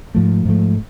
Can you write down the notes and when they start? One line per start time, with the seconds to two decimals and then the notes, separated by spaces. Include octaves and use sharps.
0.14 G#2 F3 A3
0.45 G#2 F3 A3